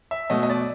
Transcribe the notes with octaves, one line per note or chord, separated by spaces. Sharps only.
E5
B2 F#3 A3 D#5
D#5
D5